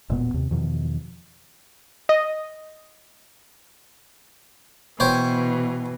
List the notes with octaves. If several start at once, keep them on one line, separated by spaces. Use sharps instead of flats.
E1 A#2 B3
D#2 C3
E2 B2 D#3 F3
D#5
B2 E3 C5 C#5 G5